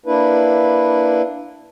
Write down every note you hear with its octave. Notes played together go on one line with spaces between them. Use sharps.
A#3 D4 E4 B4